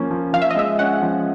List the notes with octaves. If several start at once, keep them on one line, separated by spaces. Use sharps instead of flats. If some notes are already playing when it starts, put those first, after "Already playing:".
Already playing: F3 A#3 C#4
F3
F3 F5
E5
D#5
G#3 E5
C#4 F#5
F3